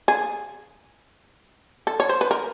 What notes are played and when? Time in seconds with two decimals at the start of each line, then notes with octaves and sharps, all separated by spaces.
0.08 G#4
1.87 A4
2.00 C#5
2.09 C5
2.21 B4
2.31 A#4